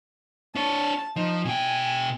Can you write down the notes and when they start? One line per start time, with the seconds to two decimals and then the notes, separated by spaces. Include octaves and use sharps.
0.55 D4 C#5 A5
1.16 F3 D#4
1.45 B2 G5 G#5